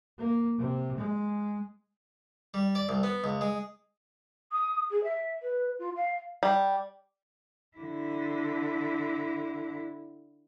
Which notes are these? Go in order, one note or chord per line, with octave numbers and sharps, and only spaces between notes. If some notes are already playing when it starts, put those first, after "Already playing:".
A#3
C3
G#3
G3
D5
C2
B3
C#2
G#3
D#6
G#4
E5
B4
F4
F5
G3
D3 E4